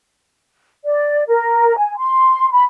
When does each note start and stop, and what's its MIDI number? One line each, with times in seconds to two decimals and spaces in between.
0.85 1.23 74
1.28 1.73 70
1.77 1.97 80
1.97 2.50 84
2.52 2.64 83